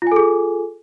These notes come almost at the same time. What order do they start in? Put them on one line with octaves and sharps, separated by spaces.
F4 G#5 A4 G#4